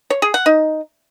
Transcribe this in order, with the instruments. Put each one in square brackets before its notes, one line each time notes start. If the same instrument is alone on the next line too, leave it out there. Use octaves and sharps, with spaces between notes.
[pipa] C#5
G#4
F#5
D#4